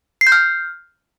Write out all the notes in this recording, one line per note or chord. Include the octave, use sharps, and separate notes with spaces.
C7
G6
F6